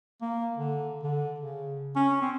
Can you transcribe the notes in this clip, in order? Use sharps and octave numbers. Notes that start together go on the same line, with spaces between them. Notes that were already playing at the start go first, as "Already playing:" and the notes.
A#3
D3
D3
C#3
C#4
C4